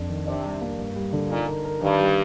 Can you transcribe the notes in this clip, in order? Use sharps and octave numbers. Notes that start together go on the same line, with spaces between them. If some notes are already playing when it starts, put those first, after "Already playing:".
Already playing: F2 D4
D#3
C3 D4
G3
A#3
G2
G3
D3
A#2 D#4
A#4
A#4
G2 D#3
G3